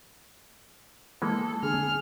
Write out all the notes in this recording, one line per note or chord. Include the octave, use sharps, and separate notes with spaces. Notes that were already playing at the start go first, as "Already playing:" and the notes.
E3 G#3 A#3 A4
D3 G#4 F6